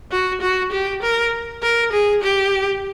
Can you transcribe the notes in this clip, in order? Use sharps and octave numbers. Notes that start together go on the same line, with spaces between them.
F#4
F#4
G4
A#4
A#4
G#4
G4